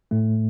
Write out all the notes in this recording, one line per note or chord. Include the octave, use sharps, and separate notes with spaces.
A2 A3